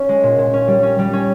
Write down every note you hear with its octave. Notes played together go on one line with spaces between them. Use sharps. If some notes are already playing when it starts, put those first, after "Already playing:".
Already playing: C#4
G#3
A#2
A#2
C#4
G3
C#4
G3
C#4